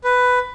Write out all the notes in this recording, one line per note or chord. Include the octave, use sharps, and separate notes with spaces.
B4